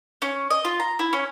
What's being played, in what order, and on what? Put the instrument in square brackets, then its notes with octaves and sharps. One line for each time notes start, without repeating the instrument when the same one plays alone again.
[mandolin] C#4
D#5
F4
A#5
E4
C#4